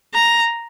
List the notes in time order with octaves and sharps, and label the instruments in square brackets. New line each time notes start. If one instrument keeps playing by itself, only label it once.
[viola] A#5